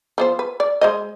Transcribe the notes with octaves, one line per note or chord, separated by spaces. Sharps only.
F3 B3 C5
B4
D5
G#3 C5 D#5